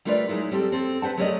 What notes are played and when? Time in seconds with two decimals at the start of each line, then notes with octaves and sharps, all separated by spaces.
0.05 G3 A3 F4 A#4 B4 D5
0.28 F#3 G#3 D#4 E4
0.51 G3 C4 G4 A4
0.72 C4 A4
1.02 B4 C5 F#5 A5
1.17 F#3 A3 C#4 A#4 D5 D#5